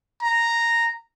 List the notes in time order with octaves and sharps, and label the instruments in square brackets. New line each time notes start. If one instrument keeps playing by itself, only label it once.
[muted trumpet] A#5